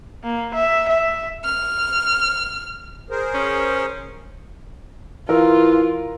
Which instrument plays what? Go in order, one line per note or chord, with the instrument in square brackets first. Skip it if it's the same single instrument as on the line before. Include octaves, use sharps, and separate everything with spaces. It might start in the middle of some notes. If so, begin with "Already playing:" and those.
[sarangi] A#3
E5
E5
[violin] F6
[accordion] G#4 A#4 C5
[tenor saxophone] C#4
[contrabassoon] E3 [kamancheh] F4 [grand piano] A#4